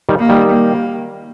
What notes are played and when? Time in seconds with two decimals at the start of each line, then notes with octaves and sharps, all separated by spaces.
0.09 D#3 G3
0.19 A#3
0.29 D#3 G3
0.50 A#3